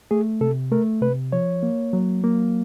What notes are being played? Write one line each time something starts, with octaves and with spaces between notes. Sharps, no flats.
A3 G#4
C3 A4
A3 A#4
C3 B4
F3 C#5
A#3
F#3
A#3